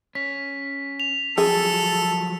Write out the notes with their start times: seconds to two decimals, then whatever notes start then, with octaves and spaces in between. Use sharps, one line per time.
0.15 C#4 B6
1.00 F7
1.38 F3 F#3 G#4 A4